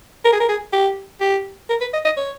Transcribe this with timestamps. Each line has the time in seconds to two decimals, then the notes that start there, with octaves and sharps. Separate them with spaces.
0.25 A#4
0.33 G#4
0.40 A#4
0.49 G#4
0.73 G4
1.21 G4
1.70 A#4
1.81 B4
1.94 D#5
2.05 D#5
2.17 C#5